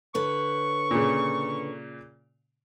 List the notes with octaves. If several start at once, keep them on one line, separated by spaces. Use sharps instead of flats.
D3 B4 C#5 C#6
A#2 C#3